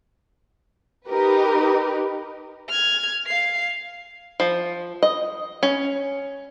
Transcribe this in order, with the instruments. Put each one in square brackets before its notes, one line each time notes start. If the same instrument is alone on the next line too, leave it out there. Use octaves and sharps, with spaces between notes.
[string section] D#4 G4 A#4 B4
[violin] F6 G#6
F5 C7
[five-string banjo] F3
D#5
C#4